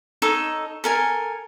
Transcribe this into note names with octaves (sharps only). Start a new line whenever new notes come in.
D#4 A4 C#5
A4 A#4 G#5